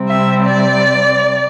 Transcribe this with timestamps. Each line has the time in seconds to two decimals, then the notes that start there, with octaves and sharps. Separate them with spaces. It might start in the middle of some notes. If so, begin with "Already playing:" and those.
Already playing: C3 G3 C4
0.08 E5
0.46 D5